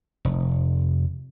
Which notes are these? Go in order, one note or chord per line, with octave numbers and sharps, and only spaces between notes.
F1